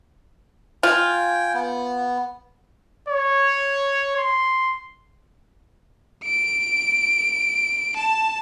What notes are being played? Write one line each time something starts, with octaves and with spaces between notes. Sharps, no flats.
F4 G5 G#5
B3
C#5
C6
D7
A5